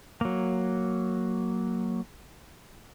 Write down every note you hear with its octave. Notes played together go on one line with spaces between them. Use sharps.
F#3 A#3